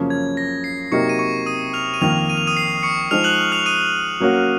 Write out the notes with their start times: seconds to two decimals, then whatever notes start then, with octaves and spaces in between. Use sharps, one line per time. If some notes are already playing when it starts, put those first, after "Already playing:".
Already playing: F#2 C#3 F3 A#3 C#4
0.10 G#6
0.37 A#6
0.64 C7
0.92 C3 F#3 A#3 D#4 A#4 C#6 C#7
1.09 D#7
1.19 C#6 C#7
1.46 D#6 D#7
1.73 F6 F7
1.94 D#7
2.01 F2 D#3 A#3 F6 F7
2.29 D#7
2.37 F7
2.47 D#6 D#7
2.57 C7
2.83 C#6 C#7
3.11 F3 G#3 D#4 G#4 C5 F6 F7
3.24 F#6 F#7
3.52 F6 F7
3.66 D#6 D#7
4.20 F#3 A#3 C#4 F#4